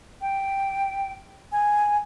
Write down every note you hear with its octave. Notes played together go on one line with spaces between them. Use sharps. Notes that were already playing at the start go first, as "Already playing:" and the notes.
G5
G#5